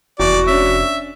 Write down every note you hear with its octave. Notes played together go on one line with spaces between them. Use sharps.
F1 E2 F#4 D5
C#4 D4 E5